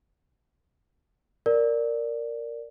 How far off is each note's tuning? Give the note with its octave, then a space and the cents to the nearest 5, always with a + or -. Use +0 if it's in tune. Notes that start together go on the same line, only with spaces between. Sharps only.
A#4 -5 D5 +0